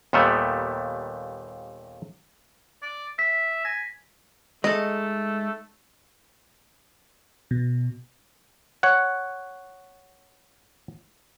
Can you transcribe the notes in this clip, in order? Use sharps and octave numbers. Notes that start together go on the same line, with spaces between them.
D#2 A#2 D#3 G3 A3 B3
D5
E5 B6
G#5 A#6
G#3 A3 D#4 A4 D#5
B2
C#5 F#5